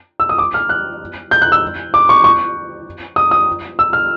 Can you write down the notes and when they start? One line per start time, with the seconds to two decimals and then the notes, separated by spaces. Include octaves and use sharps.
0.20 E6
0.29 D#6
0.38 D6
0.54 F6
0.69 F#6
1.31 G6
1.42 F#6
1.52 E6
1.94 D6
2.09 C#6
2.24 C#6
3.16 D#6
3.31 D#6
3.79 E6
3.93 F6